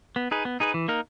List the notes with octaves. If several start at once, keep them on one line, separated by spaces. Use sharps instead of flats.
B3
D#4 G#4 B4
B3
D#4 G#4 B4
E3
A#3 D#4 A#4